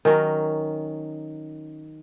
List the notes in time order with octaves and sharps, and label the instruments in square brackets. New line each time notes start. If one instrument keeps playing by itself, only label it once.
[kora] D#3 F#3 C#4 A#4